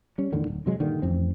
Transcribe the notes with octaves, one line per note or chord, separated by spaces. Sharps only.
G3 C#4
E2 A2 D3 D#3
D1
C3 F#3 G#3
G2 A#2 D3 D#3
A1 F2 C4